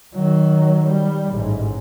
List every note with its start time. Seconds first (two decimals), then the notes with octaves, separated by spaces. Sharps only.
0.14 D#3 F#3
0.87 G3
1.30 A1 G#2